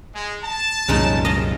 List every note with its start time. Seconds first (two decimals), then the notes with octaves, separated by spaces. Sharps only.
0.14 G#3
0.43 A5
0.88 C2 F#2 A#2 C#3 G#3 D#4
1.25 D#5 F5 A5